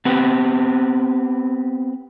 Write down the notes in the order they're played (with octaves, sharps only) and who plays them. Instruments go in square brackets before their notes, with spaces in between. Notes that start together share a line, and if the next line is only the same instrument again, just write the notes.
[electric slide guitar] B3 C4 G4 B4